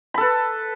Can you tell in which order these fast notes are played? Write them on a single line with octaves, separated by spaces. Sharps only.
B5 A4 B4